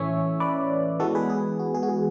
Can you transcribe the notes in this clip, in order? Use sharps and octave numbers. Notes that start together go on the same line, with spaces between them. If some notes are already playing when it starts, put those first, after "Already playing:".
Already playing: A2 E3 A3 C#4 C#5 E5
B4 D5
E3 G#3 B3 F#4 A4
G#4 B4
G#4
F#4
G#4
F#4
G#4